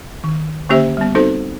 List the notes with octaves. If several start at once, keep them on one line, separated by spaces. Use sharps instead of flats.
D#3
D3 A#3 C#4 G4 C5 E5
G3 B3
C4 D#4 F#4 A4 C5